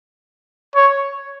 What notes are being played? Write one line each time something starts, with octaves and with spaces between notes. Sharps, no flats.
C#5